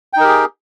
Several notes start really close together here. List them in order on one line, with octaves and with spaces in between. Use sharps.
G5 D#4 A#4 G4 G#4